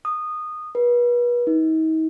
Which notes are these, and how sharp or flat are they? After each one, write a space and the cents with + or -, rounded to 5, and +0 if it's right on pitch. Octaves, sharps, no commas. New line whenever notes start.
D#6 -15
B4 -35
D#4 +40